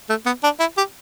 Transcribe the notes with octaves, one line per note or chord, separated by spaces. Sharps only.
A3
B3
D4
E4
G4